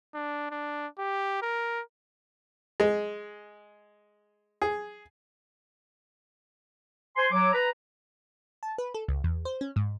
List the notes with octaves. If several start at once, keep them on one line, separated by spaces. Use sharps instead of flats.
D4
D4
G4
A#4
G#3
G#4
C5 G#5 C6
F#3 D6
B4 A#5
A5
B4
A4
C#2
E2
C5
C#4
G#2